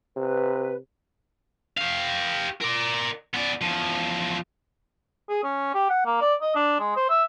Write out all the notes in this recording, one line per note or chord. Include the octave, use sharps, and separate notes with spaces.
C3 B4
G4 F5
A#4 D5
B3 D5
E2 F3
G#4
C#4
G4
F#5
A#3
D5
D#5
D4
G#3
C5
E5